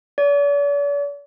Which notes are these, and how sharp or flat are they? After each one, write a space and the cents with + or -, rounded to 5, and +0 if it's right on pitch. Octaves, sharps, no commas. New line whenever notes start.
D5 -45